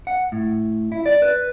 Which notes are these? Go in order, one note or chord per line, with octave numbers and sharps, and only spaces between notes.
F#5
A2
E4
D5
B4